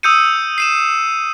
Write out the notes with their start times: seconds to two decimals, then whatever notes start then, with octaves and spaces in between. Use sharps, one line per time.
0.03 D#6 E6 G6 C#7 D#7
0.58 C7 D#7 E7